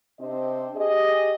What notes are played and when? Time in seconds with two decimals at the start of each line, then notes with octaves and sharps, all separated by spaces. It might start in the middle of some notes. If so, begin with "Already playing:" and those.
0.20 C3 C4 D4 C5 D#5
0.76 G4 G#4 D#5